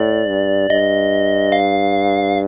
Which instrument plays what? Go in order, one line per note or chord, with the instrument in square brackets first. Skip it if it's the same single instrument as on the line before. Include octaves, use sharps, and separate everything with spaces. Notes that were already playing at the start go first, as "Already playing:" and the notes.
Already playing: [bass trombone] A2 [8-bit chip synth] D5
[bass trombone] G2
[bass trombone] G2 [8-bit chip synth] D#5
[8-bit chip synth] F5